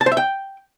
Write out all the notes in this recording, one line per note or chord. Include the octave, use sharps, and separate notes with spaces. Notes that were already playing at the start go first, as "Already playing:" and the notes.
A5
C5
E5
G5